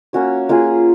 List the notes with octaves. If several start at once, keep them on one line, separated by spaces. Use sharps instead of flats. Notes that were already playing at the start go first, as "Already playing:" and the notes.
A#3 C#4 F#4 C#5
A#3 F4 G#4